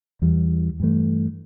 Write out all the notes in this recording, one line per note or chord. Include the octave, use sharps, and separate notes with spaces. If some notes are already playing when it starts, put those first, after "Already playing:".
E2 E3 G3
G2 E3 A3